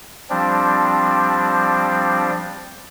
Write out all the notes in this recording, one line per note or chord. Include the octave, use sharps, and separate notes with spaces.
F3 G3 C4 D4